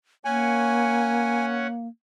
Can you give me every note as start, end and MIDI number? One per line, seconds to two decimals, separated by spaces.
0.25 1.88 58
0.25 1.67 61
0.25 1.67 73
0.25 1.67 78
0.25 1.46 80